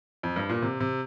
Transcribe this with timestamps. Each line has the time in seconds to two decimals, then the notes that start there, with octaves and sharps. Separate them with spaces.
0.23 F2
0.36 G2
0.49 A#2
0.62 C3
0.80 C3